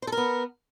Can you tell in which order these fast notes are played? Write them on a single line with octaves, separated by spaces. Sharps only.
C5 A4 A#4 B3